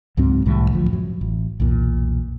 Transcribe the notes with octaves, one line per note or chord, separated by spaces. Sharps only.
C#2 G#2 F#3 C4
C2 A2 D#3 G3
A1 D2 F3
F#2 F#3
A1
B1 E2 A#2